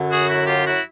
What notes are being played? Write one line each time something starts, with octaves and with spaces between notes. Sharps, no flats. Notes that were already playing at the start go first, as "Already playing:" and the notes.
Already playing: F#2 D3 F#3
F#4 G#4
E4 F#4
F4 G4
E4 F#4